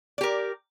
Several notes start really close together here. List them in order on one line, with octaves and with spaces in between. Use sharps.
D5 G4 A#4